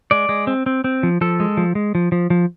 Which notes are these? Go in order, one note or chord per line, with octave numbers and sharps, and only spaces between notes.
G#3 D5
G#3
C4
C4
C4
F3
F3 A4
G#3
F3
G#3
F3
F3
F3